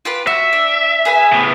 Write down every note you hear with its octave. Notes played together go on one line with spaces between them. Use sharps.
F4 G4 B4
F#4 E5
D4
G#4 B4 G#5
A2 B3